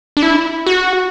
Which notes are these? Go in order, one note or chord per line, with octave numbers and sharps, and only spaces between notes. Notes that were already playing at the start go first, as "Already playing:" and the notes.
D4
E4
F#4